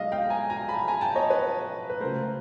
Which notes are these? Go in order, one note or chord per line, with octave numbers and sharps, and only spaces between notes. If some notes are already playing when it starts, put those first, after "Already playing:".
Already playing: B1 B2 G#3 D#5 F5
F5 G5
G#5 A#5
G#5 A#5
A5 B5
G#5 A#5
G5 A5
C#5 D#5
B4 C#5
B4
C#2 C#3 F#3 A3 A#4 C5